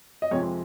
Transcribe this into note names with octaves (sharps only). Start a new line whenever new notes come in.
D#5
F2 C3 F3 G#3 C4 C#5